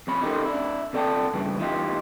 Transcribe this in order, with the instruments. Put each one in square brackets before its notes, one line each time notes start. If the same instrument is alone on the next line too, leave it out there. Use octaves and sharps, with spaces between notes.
[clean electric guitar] F2 C#4 B5
C#4 D#4 G4 A4 A#4 C5
D4 E4
C3 A4 D5 G5 A5
G2 C#3 E3
E3 D#4 F4 G4